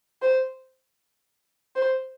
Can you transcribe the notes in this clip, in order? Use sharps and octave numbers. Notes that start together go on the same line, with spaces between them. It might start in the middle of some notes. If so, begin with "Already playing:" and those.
C5
C5